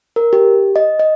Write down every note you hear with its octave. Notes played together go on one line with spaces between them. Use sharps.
A#4
G4
D#5
D#5